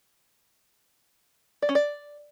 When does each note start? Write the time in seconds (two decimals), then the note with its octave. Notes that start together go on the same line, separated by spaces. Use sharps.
1.62 D5
1.69 C#4
1.75 D5